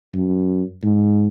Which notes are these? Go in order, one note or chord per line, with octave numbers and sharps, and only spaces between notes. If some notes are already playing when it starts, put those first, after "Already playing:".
F#2
G#2